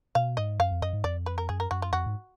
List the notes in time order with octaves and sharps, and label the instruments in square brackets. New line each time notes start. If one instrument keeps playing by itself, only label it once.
[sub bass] B2 [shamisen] F5
[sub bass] G#2 [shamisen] D#5
[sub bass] F#2 [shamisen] F5
[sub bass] F2
[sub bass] F#2 [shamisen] D#5
[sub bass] G#2
[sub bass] F2 [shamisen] D5
[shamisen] B4
A#4
[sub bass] F#2 [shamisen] G#4
[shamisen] A#4
[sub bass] F#2 [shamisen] F#4
[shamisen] F4
[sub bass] F2 [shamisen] F#4
[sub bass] G#2